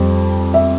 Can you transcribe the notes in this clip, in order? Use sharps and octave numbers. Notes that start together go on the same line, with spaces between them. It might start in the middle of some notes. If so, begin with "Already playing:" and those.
Already playing: F2 G3
E5